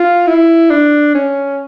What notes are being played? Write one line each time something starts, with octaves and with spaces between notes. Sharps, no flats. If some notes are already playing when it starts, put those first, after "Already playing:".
Already playing: F4
E4
D4
C#4